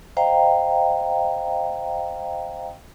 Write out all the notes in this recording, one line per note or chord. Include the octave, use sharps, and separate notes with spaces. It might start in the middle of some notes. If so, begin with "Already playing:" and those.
C5 D#5 F5 G5 A#5